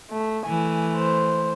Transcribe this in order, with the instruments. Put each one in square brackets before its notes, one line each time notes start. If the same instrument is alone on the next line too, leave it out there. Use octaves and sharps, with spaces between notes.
[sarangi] A3
[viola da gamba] E3 A3 [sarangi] G#5
[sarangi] C5